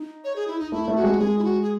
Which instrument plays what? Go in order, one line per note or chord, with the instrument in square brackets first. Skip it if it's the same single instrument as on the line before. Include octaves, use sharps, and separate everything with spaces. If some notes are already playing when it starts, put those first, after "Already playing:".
Already playing: [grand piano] D#4
[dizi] C#5
G#4
E4
D#4
[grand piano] A3 [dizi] E4
[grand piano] A3
[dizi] F#4
[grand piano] G#3
[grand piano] G#3 [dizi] G#4
[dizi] E4
F#4
G#4